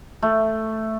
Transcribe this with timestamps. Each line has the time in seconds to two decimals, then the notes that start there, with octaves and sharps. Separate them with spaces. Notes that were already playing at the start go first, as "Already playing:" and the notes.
0.22 A3